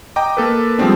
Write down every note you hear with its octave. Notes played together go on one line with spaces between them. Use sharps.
D#5 G5 A#5 D6
A#3 A4 B4
F3 G3 G#3 B3 C4 D4